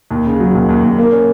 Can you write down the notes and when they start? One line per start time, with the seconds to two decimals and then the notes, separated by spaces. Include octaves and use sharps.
0.11 D#2
0.25 C#3
0.40 F#3
0.55 D#2
0.69 D#2
0.84 D#2
0.98 A#3
1.12 C#4